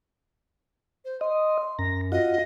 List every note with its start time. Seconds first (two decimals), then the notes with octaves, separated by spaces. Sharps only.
1.05 C5
1.21 D#5 C6
1.79 F#2 A#5
2.12 F4 F#4 D#5